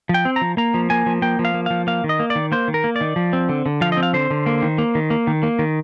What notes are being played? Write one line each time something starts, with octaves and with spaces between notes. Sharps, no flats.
F3
G5
C4
A#5
F3
A#3 A#5
F3
A#3 G#5
F3
A#3 G5
F3
F5
A#3
F3 F5
A#3 F5
D#3
D#5
A#3
D5
D#3
A#3 C5
D#3
A#4
A#3
D5
D#3
F3
C4
D3
D3
F3 F5
C4 D#5
F5
D3 C5
D3
A#3
D#3
A#3
D#3
A#3
D#3
A#3
D#3